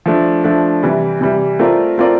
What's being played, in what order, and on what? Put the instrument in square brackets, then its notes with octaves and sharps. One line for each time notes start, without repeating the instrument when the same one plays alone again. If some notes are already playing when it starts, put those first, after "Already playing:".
[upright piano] F3 A3 D4
F3 A3 D4
C3 E3 G3
C3 E3 G3
A3 C4 F4 A#4 D5
A3 C4 F4 A#4 D5